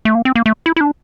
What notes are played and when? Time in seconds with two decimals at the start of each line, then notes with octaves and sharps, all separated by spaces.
0.05 A3
0.15 A#3
0.25 C4
0.35 A#3
0.46 A3
0.66 E4
0.76 E4
0.81 D4